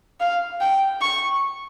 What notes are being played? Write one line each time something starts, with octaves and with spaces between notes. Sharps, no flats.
F5
G5
C#6